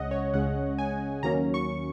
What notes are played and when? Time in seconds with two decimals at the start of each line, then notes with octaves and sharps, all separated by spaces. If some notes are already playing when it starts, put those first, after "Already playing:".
Already playing: C#2 C#3 G#3 C#4 D#5 F#5
0.11 C#5
0.34 C#2 C#3 G#3 C#4 F#5
0.78 G#5
1.23 D#2 D#3 F#3 A#3 C#4 A#5
1.54 C#6